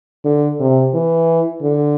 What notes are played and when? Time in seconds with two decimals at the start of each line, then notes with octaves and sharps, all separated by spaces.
0.25 D3
0.60 C3
0.94 E3
1.62 D3